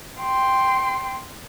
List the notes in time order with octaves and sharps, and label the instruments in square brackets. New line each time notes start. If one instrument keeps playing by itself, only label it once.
[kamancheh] G5 C6